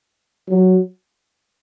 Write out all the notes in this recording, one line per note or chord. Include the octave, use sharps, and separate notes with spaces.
F#3